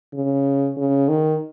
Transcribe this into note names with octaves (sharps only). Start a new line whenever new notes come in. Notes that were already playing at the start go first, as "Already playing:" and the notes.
C#3
C#3
D#3